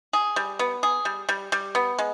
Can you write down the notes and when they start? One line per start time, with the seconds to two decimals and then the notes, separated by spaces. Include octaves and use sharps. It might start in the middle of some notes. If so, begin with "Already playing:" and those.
0.13 G#4
0.36 G3
0.59 B3
0.83 G#4
1.05 G3
1.29 G3
1.52 G3
1.75 B3
1.99 G#3